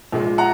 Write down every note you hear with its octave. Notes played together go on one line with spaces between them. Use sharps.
A#1 A#2 G#3
F#5 A#5